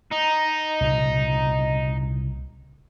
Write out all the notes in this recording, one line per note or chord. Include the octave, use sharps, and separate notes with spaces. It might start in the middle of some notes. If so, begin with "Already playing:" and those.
D#4
C2 A#2 C#3